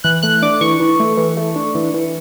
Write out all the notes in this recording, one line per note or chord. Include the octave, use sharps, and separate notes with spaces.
E3 F#6
A3 F#6
D4 D6
E3 C#6
E3
A3
E3
A3
D4
E3
E3